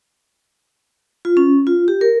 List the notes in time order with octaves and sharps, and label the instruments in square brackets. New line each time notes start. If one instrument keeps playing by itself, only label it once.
[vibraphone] F4
C#4
F4
G4
A#4